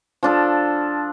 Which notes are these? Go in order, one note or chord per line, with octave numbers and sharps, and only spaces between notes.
F3 D4 A4